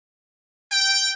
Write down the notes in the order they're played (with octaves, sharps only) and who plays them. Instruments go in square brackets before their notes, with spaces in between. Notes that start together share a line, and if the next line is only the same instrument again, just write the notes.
[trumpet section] G5